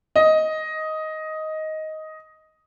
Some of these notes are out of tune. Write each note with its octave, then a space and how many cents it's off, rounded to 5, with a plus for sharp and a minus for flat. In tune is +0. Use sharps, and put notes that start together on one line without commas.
D#5 +10